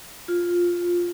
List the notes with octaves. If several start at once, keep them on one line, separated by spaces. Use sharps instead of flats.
F4